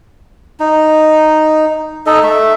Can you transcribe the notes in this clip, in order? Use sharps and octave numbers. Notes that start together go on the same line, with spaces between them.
D#4
D#4 A4 D#5
A3 E5